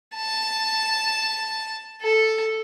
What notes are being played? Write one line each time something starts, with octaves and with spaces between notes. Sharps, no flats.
A5
A4